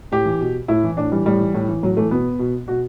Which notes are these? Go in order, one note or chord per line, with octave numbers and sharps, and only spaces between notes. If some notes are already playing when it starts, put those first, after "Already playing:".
A2 G4
E3
B2
A2 E4
E3
A2 D4
E3 G3
A2 G3
E3
A2
E3
A2 F#3
E3 A3
B2 B3
B2
B2 F#4